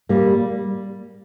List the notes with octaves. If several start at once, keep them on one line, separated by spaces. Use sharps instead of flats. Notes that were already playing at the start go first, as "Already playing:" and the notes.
G3 A#3